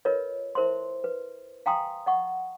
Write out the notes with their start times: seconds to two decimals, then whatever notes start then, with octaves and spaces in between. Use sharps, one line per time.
0.05 F4 A#4 B4 C#5 D#5
0.55 E4 A#4 C5 E5 C6
1.04 B4
1.66 F5 G5 G#5 A#5 C6 D#6
2.06 D#5 F#5 C#6